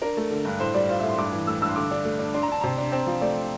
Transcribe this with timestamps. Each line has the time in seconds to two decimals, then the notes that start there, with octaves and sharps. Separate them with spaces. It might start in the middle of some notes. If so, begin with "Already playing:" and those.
0.02 D4 A#4
0.17 A3
0.31 D3
0.45 G2
0.60 A2 C5
0.74 G3 D5
0.89 F4 C5
0.99 E5
1.03 A2
1.09 C6
1.18 G2 D6
1.32 E3
1.47 A3 E6
1.61 G2 E6
1.69 C6
1.76 D3 D6
1.91 D4
2.05 A3
2.19 D4
2.34 D4 C6
2.43 A#5
2.48 D4 A5
2.61 C3 A#5
2.78 D4
2.92 C4
3.07 F3
3.21 A3 D5